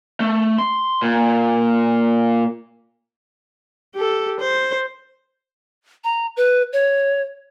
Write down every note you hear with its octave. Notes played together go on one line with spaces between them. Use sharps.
A3
C6
A#2
G4 A4
C5
A#5
B4
C#5